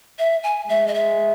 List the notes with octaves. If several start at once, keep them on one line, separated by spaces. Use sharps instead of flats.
E5
G#5
G#3 E5
D#5
E5